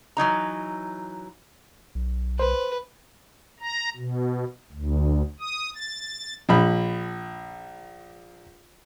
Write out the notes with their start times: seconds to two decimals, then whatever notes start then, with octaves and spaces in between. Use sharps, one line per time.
0.17 E3 F#3 D#4 A#5
1.95 B1
2.39 B4 C5
3.60 A#5
3.96 B2
4.72 D2
5.40 D#6
5.75 A6
6.49 A#1 B5